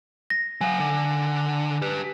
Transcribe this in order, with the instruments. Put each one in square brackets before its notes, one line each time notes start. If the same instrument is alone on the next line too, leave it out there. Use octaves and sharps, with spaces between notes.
[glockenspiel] A#6
[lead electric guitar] F#3 F5 [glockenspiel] G#5
[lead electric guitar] D3
G4 B4